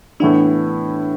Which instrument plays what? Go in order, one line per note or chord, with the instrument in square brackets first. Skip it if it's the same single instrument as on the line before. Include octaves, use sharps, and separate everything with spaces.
[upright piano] A2 E3 B3 E4 [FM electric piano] D4